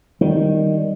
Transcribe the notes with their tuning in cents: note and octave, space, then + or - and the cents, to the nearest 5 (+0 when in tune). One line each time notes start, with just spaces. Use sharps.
D#3 +0 G3 +0